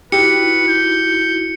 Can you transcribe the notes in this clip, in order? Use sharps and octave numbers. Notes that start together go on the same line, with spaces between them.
D#4 E4 F#4 G4 B4 C#7
G6